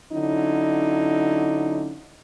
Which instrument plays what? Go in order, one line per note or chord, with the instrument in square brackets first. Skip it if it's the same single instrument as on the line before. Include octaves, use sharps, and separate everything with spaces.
[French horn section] D3 F#3 C#4 D#4 E4